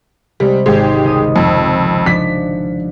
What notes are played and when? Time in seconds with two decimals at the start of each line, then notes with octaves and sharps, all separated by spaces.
0.40 C3 G3 G#3 C4
0.66 G#1 G#3 G4 G#6
1.04 C#2 D#5 D#6
1.36 F2
2.06 F3 D4 B6